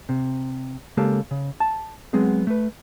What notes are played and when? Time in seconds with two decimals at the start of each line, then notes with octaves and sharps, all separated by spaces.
0.09 C3
0.97 C#3 G#3 A#3 G4 A4
1.31 C#3
1.60 A5
2.13 F#3 G#3 B3 C4 G#4
2.47 A3 B4